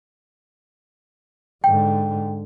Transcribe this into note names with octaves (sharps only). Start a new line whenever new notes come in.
G#2 D3 G5